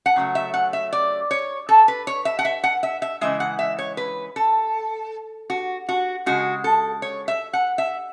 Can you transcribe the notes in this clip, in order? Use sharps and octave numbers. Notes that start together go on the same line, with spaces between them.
F#5
C#3 F#3 A3
E5
F#5
E5
D5
C#5
A4
B4
C#5
E5
F#5
E5
F#5
E5
E5
C#3 E3 G#3 E5
F#5
E5
C#5
B4
A4
F#4
F#4
C#3 G#3 F#4
A4
C#5
E5
F#5
E5